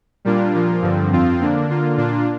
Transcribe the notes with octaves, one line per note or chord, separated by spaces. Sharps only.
A#2 G3 A#3 D4 F4
A#2 F3 A#3 F4
G2 D3 F3 C4
F2 F3 C4 F4
D3 A#3 D4
D3 A#3 F4
A#2 A#3 D4 F4